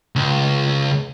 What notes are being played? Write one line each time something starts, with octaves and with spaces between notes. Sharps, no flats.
C#2